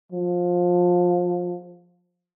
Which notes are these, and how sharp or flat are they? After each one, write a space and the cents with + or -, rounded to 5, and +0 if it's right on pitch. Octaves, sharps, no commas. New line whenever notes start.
F3 +20